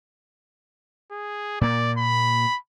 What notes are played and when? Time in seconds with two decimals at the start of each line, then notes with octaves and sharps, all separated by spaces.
1.11 G#4
1.61 A#2 A#3 D5
1.98 B5